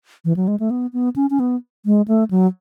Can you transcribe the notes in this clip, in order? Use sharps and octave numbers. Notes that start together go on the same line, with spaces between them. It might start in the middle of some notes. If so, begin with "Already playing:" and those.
E3
F#3
G#3
A3
B3
B3
C#4
C#4
B3
G#3
A3
F#3